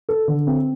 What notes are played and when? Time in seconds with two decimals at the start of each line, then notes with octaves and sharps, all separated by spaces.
0.09 A4
0.28 D3
0.47 C4